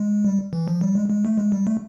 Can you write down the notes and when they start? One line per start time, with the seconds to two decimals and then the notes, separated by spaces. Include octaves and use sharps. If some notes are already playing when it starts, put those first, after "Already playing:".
Already playing: G#3
0.25 G3
0.53 E3
0.68 F3
0.81 G3
0.95 G#3
1.10 G#3
1.25 A3
1.38 G#3
1.52 G3
1.67 A3